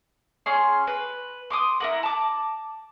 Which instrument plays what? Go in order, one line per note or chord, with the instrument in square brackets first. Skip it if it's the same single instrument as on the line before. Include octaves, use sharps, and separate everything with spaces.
[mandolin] C#4 G#4 C6
B4
C6 D6 D#6
E4 A#4 F#5
A5 D6